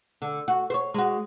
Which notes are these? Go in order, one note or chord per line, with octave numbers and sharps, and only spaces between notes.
D3
F#4
C5 C#5
G#3 F#4